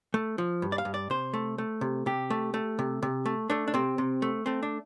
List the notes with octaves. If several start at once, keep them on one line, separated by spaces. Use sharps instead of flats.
A3
F3
G2
D5
F5
G2
D5
C3 C5
A3
A3
C3
C3 G4
A3
A3
C3
C3
A3
A3 D4
D4
C3 C4
C3
A3
A3 C4
D4